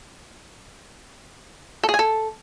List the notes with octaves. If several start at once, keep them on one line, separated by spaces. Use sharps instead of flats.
A4
G#4
G#5
A4